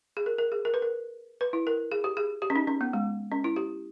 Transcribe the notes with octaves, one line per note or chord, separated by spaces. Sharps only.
G#4
A#4
A#4
G#4
A#4
B4
A#4
B4
E4
A#4
G#4
G4
G#4
G4
C#4
D#4
C#4
B3
G#3
C#4
E4
G4